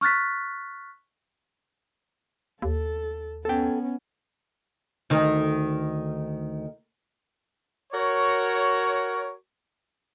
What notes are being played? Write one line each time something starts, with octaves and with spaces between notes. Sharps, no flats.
C#6 F6 F#6 A6 B6
D#2 A4
B3 C#4 A4 G5
D2 D#3
F#4 A#4 C#5